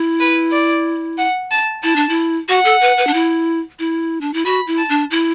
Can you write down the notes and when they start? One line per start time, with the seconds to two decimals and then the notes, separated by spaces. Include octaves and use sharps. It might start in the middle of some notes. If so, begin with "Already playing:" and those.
Already playing: E4
0.20 B4
0.52 D5
1.18 F#5
1.51 A5
1.83 E4 A5
1.96 D4
2.09 E4
2.48 F#4 F#5
2.65 A4
2.81 B4
2.98 B4
3.07 D4
3.14 E4
3.79 E4
4.21 D4
4.34 E4
4.45 F#4 B5
4.67 E4
4.78 A5
4.89 D4
5.11 E4